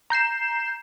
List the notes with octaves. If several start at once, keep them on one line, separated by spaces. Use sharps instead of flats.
A#5 G6 C7 E7